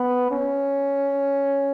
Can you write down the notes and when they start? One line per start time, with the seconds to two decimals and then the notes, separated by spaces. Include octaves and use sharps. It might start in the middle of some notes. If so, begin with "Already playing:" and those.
Already playing: B3
0.32 C#4